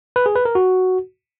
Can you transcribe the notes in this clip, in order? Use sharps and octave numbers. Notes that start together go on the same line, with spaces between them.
B4
G#4
B4
A#4
F#4